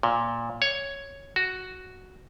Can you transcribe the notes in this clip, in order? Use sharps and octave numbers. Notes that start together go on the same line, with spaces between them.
A#2
C#5
F#4